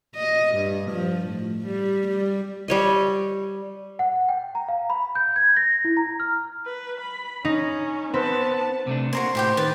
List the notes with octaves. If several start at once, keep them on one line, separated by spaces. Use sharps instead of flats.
D#5
G2
F3
A2
G3
G3
G3 C#5 D#5
F#5
G5
A#5
F5
B5
G6
G#6
A#6
E4
A#5
F6
B4
B5
C#4 D#4
B3 C4 B4 A5
C3 A3 D4
A#3 F#4 C5 A#5 C6
A2 E4 G4 G5
D#3 B4 D5